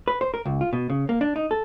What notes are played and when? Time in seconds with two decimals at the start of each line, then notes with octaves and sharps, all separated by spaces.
0.08 B4
0.21 C5
0.34 A#4
0.46 C#2
0.61 F4
0.73 B2
0.90 C#3
1.09 A#3
1.21 D4
1.36 D#4
1.51 A4